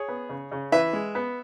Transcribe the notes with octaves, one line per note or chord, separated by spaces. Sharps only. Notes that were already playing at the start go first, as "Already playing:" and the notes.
Already playing: G#4 C#5
B3
C#3
C#3
E3 B4 E5
G#3
B3